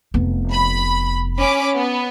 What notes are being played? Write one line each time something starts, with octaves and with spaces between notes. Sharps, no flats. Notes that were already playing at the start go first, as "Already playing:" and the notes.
F1 B3
B5
C#4 B5 D6
B3